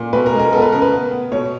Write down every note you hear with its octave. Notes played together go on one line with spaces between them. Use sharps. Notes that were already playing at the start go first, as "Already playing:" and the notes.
Already playing: A#2
B2 B4
A#4
G#3
A#4
B3 A4 A#4
B4
C#3 A#4
B4
B3
B3
B2 C#5